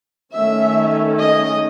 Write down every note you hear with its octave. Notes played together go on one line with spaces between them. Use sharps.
D#3 A3 C#4 E5
D#5